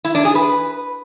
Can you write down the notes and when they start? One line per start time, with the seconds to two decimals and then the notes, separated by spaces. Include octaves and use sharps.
0.05 E4
0.15 D4
0.25 G#4
0.35 B4